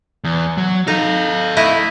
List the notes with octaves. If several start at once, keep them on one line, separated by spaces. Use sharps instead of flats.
E2
F#3
D#4 A4 F5
A3 E4 D#5